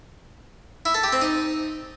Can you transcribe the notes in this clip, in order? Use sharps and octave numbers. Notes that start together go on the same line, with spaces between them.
E4
A4
G4
C4
D#4